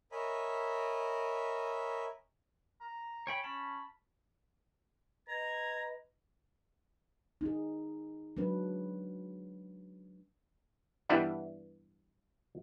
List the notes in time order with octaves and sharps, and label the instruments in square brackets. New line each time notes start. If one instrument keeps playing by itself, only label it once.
[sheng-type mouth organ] A#4 C#5 D#5 E5 G#5 B5
[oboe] A#5
[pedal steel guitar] C#5 G5 B5 [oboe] G#5
[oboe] C#4 [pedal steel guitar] A5 B5
[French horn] B4 [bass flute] D#5 [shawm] A#5 [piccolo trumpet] G#6
[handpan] D#4 G#4
F#3 G#3 D4 B4
[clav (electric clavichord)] G2 E3 G3 B3 D4 E4